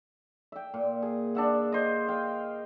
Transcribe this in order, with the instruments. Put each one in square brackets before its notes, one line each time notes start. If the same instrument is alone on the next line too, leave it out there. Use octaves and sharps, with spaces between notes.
[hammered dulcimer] E5 G5
A#2
G#4
D4 E5 F#5
C5 D#5
F5 G5